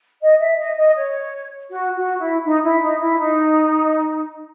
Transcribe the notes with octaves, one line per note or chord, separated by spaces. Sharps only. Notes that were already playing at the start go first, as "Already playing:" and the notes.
D#5
E5
D#5
D#5
C#5
F#4
F#4
E4
D#4
E4
D#4
E4
D#4